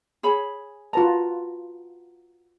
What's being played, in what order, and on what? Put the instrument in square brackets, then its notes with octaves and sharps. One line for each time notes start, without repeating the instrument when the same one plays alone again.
[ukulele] G#4 C#5 B5
[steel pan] F4 B4 A5 [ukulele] F#4 A#5